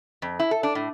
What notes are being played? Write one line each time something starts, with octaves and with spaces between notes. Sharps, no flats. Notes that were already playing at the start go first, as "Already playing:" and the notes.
F2
E4
A4
D4
A2